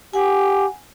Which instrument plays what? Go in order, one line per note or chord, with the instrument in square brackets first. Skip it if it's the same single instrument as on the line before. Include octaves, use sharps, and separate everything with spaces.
[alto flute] G4 [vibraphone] F#5 G#5